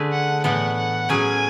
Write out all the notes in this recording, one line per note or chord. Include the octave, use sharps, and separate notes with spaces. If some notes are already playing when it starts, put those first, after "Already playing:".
Already playing: D3 A3 D4 G#4 B4
F#5
A2 E3 B3 F#5
F#5
A2 F#3 C#4 G#4 G#5